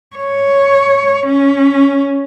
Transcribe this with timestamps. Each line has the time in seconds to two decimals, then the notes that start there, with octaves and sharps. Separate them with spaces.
0.16 C#5
1.27 C#4